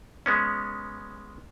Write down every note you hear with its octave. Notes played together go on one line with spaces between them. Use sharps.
G#3 B3 C#4